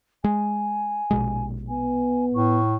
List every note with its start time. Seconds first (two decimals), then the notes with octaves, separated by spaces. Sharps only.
0.24 G#3 G#5
1.11 A#1 B2 G#3
1.69 B3 G#5
2.34 A2 C#6